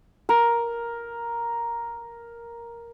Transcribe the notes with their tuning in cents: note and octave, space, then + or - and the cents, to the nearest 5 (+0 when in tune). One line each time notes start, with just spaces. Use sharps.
A#4 +5